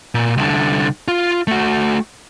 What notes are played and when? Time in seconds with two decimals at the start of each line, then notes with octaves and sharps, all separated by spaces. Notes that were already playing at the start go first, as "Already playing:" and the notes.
0.15 A#2
0.37 C2 D3
1.08 F4
1.47 A3 F#4